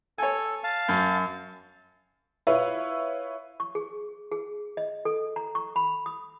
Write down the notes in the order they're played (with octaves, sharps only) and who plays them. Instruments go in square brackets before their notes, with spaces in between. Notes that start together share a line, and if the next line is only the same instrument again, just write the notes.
[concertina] A4 [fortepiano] C#5 G#5
[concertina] F5 A5
[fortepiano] F#2
[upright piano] E4 F4 B4 C#5 E5
[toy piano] C#6
G#4
G#4
D#5
A4
A#5
C#6
B5
D#6